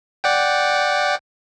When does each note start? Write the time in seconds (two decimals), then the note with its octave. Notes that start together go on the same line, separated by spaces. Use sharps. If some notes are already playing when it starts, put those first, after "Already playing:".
0.24 D5 F#5 G5